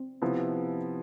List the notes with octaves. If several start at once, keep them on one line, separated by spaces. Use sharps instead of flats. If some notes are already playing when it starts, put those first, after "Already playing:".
Already playing: C4
C3 F3 B3 E4 B4